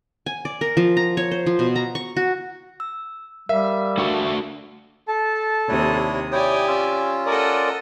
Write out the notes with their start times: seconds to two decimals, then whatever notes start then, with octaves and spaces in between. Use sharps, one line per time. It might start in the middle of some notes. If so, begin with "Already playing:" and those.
0.26 G#5
0.45 D5
0.61 A#4
0.77 F3
0.97 A#5
1.17 C#5
1.31 C5
1.46 F3
1.59 B2
1.76 A#5
1.95 C#6
2.17 F#4
2.80 E6
3.49 G3 A#4 E5 F5
3.98 A3 D4 F#4
5.08 A4 A5
5.68 D#2 C3 D4 E4 C#5 D#6
6.32 E4 G4 C#5 D5 G5 G#5 D#6
6.68 C#4 F4 E6
7.26 A4 A#4 D5 D#5 F#5 D#6